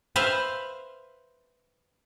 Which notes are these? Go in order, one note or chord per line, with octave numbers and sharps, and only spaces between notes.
B4 C5 E5 F5